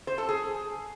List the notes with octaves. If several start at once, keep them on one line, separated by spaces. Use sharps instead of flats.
C5
A4
G#4